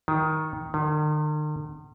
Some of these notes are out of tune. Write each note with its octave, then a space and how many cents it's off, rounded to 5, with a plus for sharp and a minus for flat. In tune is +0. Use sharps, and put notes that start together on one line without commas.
D#3 +10
D#3 -45